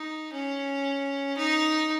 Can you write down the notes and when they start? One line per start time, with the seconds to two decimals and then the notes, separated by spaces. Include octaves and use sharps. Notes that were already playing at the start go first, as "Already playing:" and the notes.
Already playing: D#4
0.33 C#4
1.37 D#4